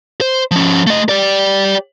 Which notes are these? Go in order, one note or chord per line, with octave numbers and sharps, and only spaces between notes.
C5
F3 C#4
A3 D#5
G4 D5